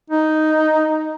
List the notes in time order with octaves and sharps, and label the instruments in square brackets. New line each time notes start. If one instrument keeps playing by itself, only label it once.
[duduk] D#4